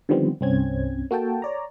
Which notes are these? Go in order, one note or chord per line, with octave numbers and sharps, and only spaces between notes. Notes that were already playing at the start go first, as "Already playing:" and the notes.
D3 D#3 F3 G3 B3 C4
C2 G2 C4 C#4 G#6
A#3 F#4 A4 G5 A5
C#5 D5 A#5